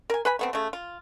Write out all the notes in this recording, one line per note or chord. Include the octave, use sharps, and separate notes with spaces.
A#4 G#5
B4 G#5 B5
A3 B3 C4
C#3 A3
F4